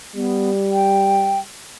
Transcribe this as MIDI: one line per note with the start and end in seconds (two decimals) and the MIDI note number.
0.15 1.45 55
0.15 0.50 59
0.72 1.39 79